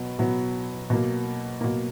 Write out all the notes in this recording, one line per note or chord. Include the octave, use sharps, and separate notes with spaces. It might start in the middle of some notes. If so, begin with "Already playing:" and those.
Already playing: B2 F#3 B3
B2 F#3 B3
B2 F#3 A#3
B2 F#3 A#3